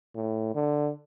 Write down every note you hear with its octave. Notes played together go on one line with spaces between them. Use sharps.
A2
D3